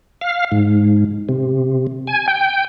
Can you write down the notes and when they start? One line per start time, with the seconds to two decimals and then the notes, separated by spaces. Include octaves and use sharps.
0.21 F5
0.51 G#2
1.29 C3
2.07 G#5
2.28 G5